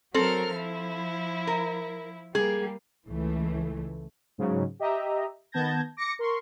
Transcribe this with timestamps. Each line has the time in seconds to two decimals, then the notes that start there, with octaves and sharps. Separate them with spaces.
0.14 F#3 C4 A4 A#4 F6
0.54 F3 E4
1.47 A#4
2.35 G3 A#3 G#4
3.07 C#2 E3 A3
4.38 G#2 C#3 F#3
4.79 G4 D#5 E5 A#5
5.52 D#3 B3 A5 G6 G#6 A#6
5.97 D6 A#6 C#7
6.19 A#4 C6 C#6